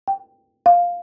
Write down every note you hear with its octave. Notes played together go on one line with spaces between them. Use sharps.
G5
F5